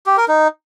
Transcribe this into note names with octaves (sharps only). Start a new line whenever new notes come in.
G4
A#4
D#4